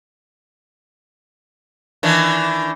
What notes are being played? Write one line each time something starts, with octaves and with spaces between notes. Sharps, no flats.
D#3 E3 D4